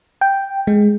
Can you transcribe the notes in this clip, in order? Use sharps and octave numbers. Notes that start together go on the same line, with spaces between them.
G5
G#3